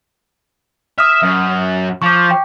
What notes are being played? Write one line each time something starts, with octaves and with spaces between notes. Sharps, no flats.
E5 D#6 F6
F#2
F3 C#6 D6
G5